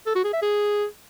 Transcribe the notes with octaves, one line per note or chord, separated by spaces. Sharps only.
A4
F#4
G#4
E5
G#4